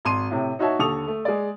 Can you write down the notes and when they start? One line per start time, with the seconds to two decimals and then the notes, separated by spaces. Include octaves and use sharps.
0.05 G#1 C6 D#7
0.31 A2 C3
0.59 D#4 F#4 C#5 E5 A5
0.79 D#2 D3 A4 C#6 D#6 F7
1.08 A3
1.25 G#3 D5